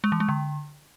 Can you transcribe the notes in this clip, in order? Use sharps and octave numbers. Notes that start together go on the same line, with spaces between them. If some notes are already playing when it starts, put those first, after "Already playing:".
G#3
E3
G#3
D3